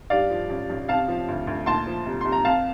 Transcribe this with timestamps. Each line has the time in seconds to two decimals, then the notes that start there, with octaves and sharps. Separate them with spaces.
0.10 G2 D5 F5
0.30 F3
0.50 A1
0.70 A1
0.89 C3 F5 A5
1.08 F3
1.28 D2
1.47 D2
1.66 A#2 A5 C6
1.87 F3
2.06 C2
2.21 C2 C6
2.32 A#5
2.45 F2 F5 A5